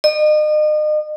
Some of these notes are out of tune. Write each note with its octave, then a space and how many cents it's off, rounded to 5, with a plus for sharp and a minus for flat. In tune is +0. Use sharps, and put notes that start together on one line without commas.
D#5 -40